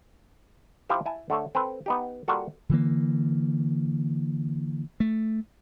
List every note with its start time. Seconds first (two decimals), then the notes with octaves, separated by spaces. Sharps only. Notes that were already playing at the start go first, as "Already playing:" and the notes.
0.89 F3 E4 F4 G4 C5 E5
1.06 E4 G#5 A5
1.30 D3 A3 A4 C#5
1.55 C4 A4 B4
1.86 B3 D#4 G4
2.28 G3 A#3 F4 F#4 A4
2.69 D3 E3 A#3
5.00 A3